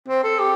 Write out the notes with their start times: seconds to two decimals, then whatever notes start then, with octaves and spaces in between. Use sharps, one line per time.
0.09 C4
0.24 A4
0.39 G4